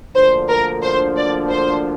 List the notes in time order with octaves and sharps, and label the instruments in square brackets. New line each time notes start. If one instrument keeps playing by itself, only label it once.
[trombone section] D2 D3 F3 A#3 D4 [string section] C5
[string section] A#4
C5
D5
C5